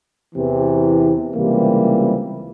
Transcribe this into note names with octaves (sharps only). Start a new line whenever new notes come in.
E2 C3 E3
C#2 C3 E3 G3 A#3